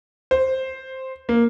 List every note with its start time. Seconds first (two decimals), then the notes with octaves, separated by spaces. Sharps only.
0.31 C5
1.29 A#3